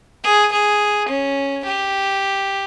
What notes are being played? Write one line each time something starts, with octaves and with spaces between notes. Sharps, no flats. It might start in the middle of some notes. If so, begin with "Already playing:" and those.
G#4
G#4
C#4
G4